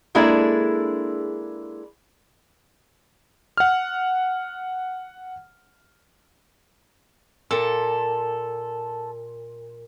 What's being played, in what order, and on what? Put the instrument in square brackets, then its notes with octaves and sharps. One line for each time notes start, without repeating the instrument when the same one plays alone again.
[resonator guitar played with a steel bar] G#3 A#3 D4 E4 G#4 A4
[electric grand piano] F#5 F6
[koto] A#2 [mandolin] A4